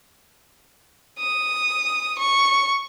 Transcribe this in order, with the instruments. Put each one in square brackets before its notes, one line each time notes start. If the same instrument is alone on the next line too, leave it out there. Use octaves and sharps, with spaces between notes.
[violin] D#6
C#6